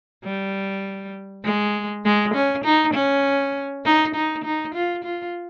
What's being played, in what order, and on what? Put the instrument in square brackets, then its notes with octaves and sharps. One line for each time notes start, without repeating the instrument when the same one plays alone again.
[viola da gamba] G3
G#3
G#3
C#4
D#4
C#4
D#4
D#4
D#4
F4
F4